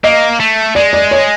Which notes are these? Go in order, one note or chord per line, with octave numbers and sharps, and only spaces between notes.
A#3 D#5
A3
G#3 D5
D5
C#5